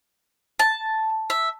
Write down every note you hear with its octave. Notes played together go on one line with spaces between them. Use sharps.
A5
E5